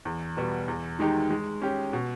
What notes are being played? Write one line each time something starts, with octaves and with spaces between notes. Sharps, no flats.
E2
B2 G3 B3
E2
D#3 G#3 D#4 G4
G#3
C#4 G4
B2